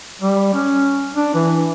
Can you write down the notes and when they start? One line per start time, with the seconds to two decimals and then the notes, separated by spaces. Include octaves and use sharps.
0.21 G3
0.54 C#4
1.14 D4
1.34 E3